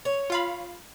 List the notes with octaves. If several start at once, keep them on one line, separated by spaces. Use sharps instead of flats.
C#5
F4 F5 B5